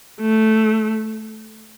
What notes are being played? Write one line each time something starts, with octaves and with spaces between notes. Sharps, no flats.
A3